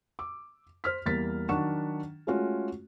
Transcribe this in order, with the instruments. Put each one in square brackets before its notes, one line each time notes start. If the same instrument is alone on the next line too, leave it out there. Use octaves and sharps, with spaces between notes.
[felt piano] D6 E6
C5 F6 B6
E2 G3 A#3 A6 B6
D#3 F#3 D4 F#5 C#6 E7
G#3 A3 C#4 F4 F#4 C#5